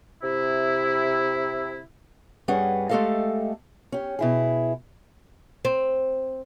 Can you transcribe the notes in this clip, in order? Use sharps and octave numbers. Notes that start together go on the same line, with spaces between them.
C3 E4
G2 G3 C#4 G#4 B4 F#5
G#3 A3 G4 A4 D#5 F5
C#4 G4
B2 E4 G#4
C4